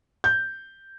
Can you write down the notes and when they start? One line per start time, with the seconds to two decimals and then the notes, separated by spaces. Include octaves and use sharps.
0.24 G6